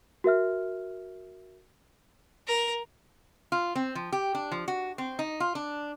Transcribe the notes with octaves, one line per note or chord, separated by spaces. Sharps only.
F#4 A#4 E5 F6
A#4
F4
C4
F3
G4
D4
F3
F#4
C4
D#4
F4
D4